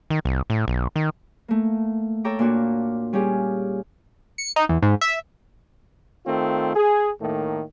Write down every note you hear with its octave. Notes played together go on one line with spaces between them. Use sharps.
D#3
C2
A2
B1
D#3
A3 A#3
A4 C#5 G5 A#5 D6
A#2 A#3 D4 F#4
G3 C#4 F4 G4 G#4
C#7
D#4
E2
G#2
E5
D#3 A3 C4 F4
G#4
A2 D#3 A3 A#3